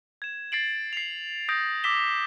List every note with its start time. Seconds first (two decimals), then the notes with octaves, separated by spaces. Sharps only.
0.22 G#6 E7
0.52 A6 C7 D7 F#7
0.93 C7 F7
1.49 D#6 G6 A#6 D7 F7
1.84 D6 E6 A#6 B6 E7 G7